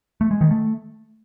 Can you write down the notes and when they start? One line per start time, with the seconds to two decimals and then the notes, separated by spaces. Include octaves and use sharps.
0.21 A3
0.31 G#3
0.41 D#3
0.51 A3